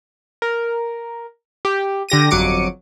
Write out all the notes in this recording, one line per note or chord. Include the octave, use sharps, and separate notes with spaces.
A#4
G4
D3 G4 A#6 D#7
G1 F2 F#3 D6 C#7 D#7